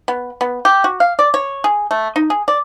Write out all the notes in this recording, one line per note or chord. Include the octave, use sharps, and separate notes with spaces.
B3
B3
G4
F#4
F5
D5
C#5
G#4
A3
D#4
G#4
D5